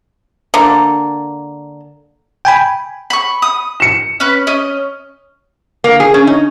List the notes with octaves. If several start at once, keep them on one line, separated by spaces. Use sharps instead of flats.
D3 A#3
G5 G#5 B5
B5 C#6
D#6
C#7 E7
C#4 B4
C#4 D#5
A#3
G#4
C#4
D#4